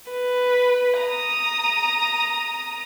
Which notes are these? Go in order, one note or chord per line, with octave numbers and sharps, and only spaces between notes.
B4
A#5 D#6